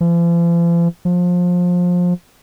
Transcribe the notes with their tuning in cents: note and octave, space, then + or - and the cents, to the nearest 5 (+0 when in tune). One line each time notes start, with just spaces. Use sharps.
F3 -45
F3 +25